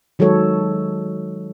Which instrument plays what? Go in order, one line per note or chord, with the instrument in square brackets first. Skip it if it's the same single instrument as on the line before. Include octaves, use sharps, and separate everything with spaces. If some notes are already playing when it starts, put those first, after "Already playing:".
[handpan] D#3 F#3 G#3 A4 C#5